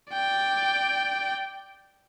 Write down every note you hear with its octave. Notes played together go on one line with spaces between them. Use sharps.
D5 G5